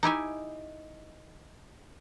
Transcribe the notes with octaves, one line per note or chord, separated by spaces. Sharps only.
D#4 E4 G4 G#5